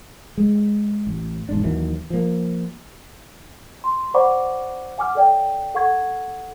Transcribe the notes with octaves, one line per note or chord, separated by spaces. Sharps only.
G#3
A1
E1 G#2 D4
D#2 D#3 E3 F#3
F3 A#3
C6
C5 D5 F#5 B5 C#6 D6
F#5 G#5 D6 F6
A4 C#5 D5 G5
A4 F#5 C#6 G#6